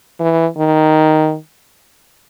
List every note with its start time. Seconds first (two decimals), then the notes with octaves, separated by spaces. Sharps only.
0.20 E3
0.57 D#3